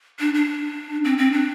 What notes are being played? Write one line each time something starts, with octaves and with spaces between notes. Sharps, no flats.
D4
D4
C4
C4
D4